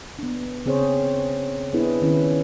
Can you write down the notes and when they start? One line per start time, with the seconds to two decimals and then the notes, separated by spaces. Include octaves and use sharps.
0.19 B3 D4
0.66 C#3 C4 G#4 C5 C#5
1.73 B3 D4 E4 G#4 B4
2.02 D#3 B3 C#4 E4 B4